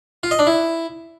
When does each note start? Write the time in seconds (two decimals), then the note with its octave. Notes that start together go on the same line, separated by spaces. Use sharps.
0.23 F4
0.31 D#5
0.39 D4
0.47 E4